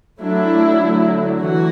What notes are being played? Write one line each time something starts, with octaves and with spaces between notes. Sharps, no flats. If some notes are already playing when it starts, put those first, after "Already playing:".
F#3 A3 D4 E4
D3 F#3 A3
E3 F#4